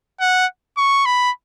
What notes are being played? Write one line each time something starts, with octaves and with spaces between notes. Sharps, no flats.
F#5
C#6
B5